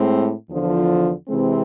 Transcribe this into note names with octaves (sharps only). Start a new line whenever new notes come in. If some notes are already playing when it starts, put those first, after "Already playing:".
Already playing: A2 G#3 C4
E2 D3 F3
C3 E3 G#3 C4